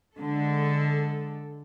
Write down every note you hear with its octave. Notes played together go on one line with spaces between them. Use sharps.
D3 G#3 A4